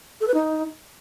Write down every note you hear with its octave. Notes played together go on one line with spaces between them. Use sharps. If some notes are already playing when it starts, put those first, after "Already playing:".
A4
B4
D#4